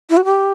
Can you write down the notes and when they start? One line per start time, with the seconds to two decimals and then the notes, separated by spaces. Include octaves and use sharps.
0.10 E4
0.17 F#4
0.25 G4